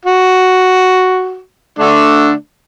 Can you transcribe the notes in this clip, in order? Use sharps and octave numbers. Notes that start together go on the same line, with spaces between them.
F#4
D3 A3 D4